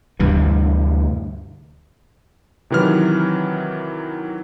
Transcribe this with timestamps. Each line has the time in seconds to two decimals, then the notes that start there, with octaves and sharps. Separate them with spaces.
0.20 D2 G2 C3 E3
2.70 C3 D#3 E3 F#3 F6